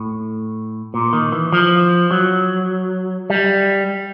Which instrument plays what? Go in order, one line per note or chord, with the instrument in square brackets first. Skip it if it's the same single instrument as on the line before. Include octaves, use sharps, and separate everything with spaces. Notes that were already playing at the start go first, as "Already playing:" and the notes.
Already playing: [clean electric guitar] A2
A#2
D#3
E3
F3
F#3
G3